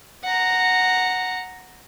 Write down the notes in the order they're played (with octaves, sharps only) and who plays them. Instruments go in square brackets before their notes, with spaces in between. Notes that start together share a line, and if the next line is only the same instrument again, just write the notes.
[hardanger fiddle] F#5 A#5